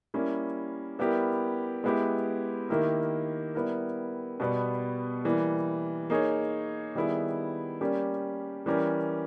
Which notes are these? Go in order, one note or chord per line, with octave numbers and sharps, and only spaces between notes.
G3 A#3 C#4 E4
G3 B3 E4 G4 A#4
G#3 B3 E4 G4
D#3 A#3 E4 G4 A#4
G3 B3 E4 A#4
B2 G3 B3
E3 G3 A#3
A#3 D#4 G#4 C#5
D#3 G3 B3 E4 G#4
G3 A#3 C#4 G4
E3 G3 C#4 G4 A#4